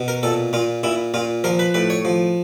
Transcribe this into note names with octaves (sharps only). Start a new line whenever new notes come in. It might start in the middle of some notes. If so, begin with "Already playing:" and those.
Already playing: B2
A#4
A#2 A4
A#2 F4
A#2 E4
A#2 F4
F3 A#4
B4
A2 B4
C#5
F3